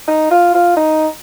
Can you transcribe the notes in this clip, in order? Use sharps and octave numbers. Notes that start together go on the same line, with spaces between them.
D#4
F4
F4
D#4